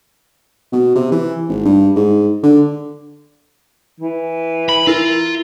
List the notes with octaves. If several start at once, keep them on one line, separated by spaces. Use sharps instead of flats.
B2
C3
E3
G#1
G2
G#2
D3
E3
B5
E4 F4 A#4